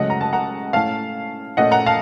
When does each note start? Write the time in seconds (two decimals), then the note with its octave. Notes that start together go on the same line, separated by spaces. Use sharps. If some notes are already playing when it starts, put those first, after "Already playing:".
Already playing: C#2 C#3 F#3 A3 C#4 D#5 F#5
0.10 A#5
0.21 A5
0.33 F#5 A#5
0.73 A2 A3 C#4 F5 A5
1.57 A#2 A3 C#4 D#5 F#5
1.71 F#5 A#5
1.86 F5 A5